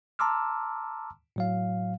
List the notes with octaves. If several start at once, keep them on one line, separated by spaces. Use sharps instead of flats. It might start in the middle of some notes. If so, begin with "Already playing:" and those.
A5 A#5 C6 D6 E6 F6
A2 F#3 F5